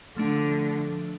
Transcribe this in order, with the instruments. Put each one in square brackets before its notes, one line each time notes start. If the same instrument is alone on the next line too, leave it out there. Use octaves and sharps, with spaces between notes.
[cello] D3 [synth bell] F3 A3 D4